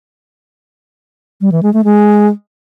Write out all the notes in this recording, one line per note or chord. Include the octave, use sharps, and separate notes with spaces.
G3
E3
G#3
A3
G#3